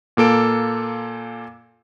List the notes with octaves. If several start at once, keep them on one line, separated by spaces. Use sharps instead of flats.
A#2 A#3 A4 D7